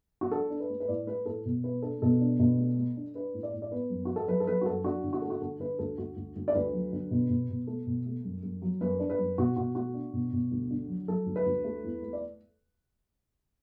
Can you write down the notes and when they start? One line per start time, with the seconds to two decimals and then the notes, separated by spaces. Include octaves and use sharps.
0.21 F#4
0.31 D4 A4
0.50 D4
0.60 B4
0.70 A3
0.80 B4
0.88 A2 D5
1.07 A3 B4
1.26 A2 A4
1.45 B2
1.64 B3 B4
1.82 D4 A4
2.02 B2 A4
2.21 D4
2.39 B2
2.58 A3
2.78 A3
2.96 D4
3.14 D4 B4
3.34 A2
3.43 D5
3.53 A2
3.62 D5
3.71 B3 B4
3.90 F#2
4.05 F#3 F#4
4.16 A4
4.27 F#3 B4
4.40 A4
4.47 F#3 B4
4.61 F#4
4.66 F#2 A4
4.84 D4 F#4
5.04 D3
5.13 F#4
5.22 A3 A4
5.30 F#4
5.41 D3 A4
5.60 D3 B4
5.79 D2 A4
5.98 D2 F#4
6.16 D2
6.36 D2
6.48 D5
6.55 D2 B4
6.73 F#3
6.93 D3
7.11 B2
7.30 B2
7.49 B2
7.67 A3 A4
7.87 B2
8.06 A3
8.24 F#2
8.43 F#2
8.62 F#3
8.81 F#2 B4
8.99 D4
9.10 B4
9.18 F#2
9.38 B2 F#4
9.57 B2 F#4
9.75 A3 F#4
9.94 D4
10.13 B2
10.33 B2
10.51 D2
10.71 D3
10.88 F#3
11.08 F#3 A4
11.26 D2
11.36 B4
11.46 D2
11.64 A3
11.84 E2
12.02 A3
12.13 D5